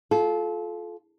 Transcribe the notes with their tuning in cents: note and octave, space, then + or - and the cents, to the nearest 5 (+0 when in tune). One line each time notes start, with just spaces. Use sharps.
F4 +0 A4 -30